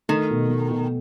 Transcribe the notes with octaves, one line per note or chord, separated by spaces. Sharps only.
D#3 A3
B2
A3
B2